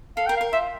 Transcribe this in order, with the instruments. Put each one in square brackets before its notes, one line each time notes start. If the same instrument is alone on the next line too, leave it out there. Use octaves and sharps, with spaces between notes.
[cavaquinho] A4 [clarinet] F5
[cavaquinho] A#4 [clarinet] G5
[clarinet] F5
[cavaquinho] A#4
[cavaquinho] F4 [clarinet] E5